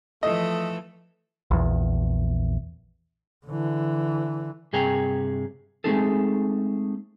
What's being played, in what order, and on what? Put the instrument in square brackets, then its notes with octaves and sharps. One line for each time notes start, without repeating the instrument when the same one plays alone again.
[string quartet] E3 A4 [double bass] F3 [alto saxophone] A3 [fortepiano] D#5
[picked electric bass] A#1 E2
[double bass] D3 E3
[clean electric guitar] G2 C3 G#4 C#5 G5 A#5
G#3 A3 C4 D#4 G#4 A4